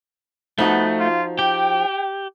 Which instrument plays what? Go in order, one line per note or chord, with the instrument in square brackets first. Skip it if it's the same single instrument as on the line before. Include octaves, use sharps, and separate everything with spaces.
[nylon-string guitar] F3 D#4 F#4 [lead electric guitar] A3 [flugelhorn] B3
[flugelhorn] F4
[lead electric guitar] G4 [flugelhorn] G5